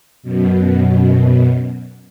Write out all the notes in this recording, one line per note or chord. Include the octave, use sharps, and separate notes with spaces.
F#2 B2